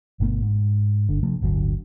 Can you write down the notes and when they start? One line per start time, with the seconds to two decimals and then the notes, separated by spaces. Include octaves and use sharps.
0.20 G1 B2 A3 B3
0.42 G#2
1.09 G1 D3
1.23 C3 F3 A3
1.41 D1 G1 D3 F#3